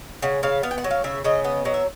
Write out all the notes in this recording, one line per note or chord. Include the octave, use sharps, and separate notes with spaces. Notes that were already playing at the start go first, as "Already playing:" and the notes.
C#3 F#5
C#3 F5
B3 F5
G5
F#5
F#3
F5
C#3 E5
C#3 D#5
B3 D#5
F#3 D#5
E5